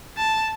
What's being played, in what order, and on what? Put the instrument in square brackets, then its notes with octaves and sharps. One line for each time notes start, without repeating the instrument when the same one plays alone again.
[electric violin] A5